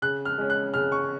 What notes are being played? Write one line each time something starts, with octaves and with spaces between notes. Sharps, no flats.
C#3 F#6
F6
G#3 C#4
F#6
C#3 F6
C#6